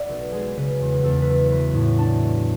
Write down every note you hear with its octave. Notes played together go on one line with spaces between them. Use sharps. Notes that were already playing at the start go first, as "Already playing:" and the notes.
Already playing: D5 E5 F#5
B1 A4
G#3 G#4
C#3 B4
E2
E2 A4
B4
F#3 A4
F#3 B4
A2
D4 A5
A3